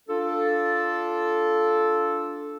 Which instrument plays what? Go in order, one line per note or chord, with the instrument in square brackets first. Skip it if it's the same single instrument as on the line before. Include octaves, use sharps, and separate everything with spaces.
[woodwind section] D4 F4 A4